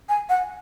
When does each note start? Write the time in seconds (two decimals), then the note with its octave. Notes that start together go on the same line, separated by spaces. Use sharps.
0.09 G#5
0.29 F#5